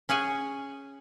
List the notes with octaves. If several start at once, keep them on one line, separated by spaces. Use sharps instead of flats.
C#4 G#4 F#5 G#5